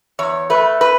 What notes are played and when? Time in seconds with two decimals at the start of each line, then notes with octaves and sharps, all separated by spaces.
0.19 E2 C#5
0.50 A3 B4
0.81 B4